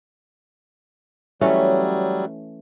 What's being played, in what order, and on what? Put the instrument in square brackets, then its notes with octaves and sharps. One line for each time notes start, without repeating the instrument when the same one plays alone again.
[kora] E3 A3 C#4 [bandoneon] F#3 G3